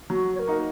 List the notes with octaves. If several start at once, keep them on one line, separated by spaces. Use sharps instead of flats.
F#3 F#4
C#5
A#4
A#3 D#4 F#4